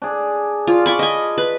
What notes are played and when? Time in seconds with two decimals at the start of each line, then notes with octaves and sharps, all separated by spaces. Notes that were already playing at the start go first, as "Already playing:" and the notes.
0.02 D4 G#4
0.67 F4 D5
0.86 D5 B5 C#6 D6
0.99 D#5 G#5
1.38 B4